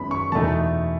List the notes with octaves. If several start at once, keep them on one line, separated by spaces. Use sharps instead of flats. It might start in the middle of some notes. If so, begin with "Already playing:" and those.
Already playing: F#2 D#3 G#3 B3 B5
C#6
E2 B2 A3 D#4 A5